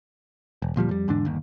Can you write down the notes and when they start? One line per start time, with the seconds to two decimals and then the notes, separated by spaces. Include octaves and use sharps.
0.62 E1
0.76 D2 A#2 F3 G3
0.89 F2 G3
1.08 E2 G#2 D3 D4
1.25 G1 D#2